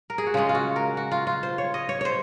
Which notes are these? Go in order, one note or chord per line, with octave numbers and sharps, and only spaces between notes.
A#4
G#4
F#4
C#3 G#3 C#4 F4
F4
F#4
A#4
F#4
F4
F4
C5
C#5
D#5
C#5
C5 C#5